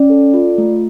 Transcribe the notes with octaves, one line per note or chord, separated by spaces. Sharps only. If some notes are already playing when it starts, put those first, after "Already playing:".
Already playing: C#4 D5
A4
F4
A3